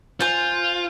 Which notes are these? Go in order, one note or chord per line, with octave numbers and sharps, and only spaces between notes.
F4 C5 G#5